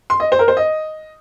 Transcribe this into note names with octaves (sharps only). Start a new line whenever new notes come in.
C6
D#5
C5
A#4
C5
D#5